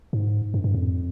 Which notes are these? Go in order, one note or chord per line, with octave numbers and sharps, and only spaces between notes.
G#2
G2
G2
F2